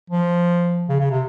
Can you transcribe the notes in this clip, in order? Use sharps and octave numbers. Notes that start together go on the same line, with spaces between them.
F3
C#3
C#3
C3